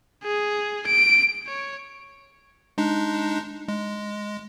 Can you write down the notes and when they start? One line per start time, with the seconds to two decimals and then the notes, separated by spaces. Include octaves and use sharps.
0.24 G#4
0.86 D7
1.47 C#5
2.78 G#3 D4 D#4
3.68 G#3